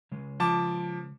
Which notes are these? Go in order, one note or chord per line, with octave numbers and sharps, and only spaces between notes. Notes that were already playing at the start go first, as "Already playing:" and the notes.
C#3 G#3
F3 A5 D6